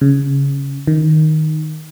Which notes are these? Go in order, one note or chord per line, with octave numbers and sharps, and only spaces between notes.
C#3
D#3